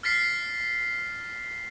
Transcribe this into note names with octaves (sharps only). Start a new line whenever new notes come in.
F6 A6 B6 C7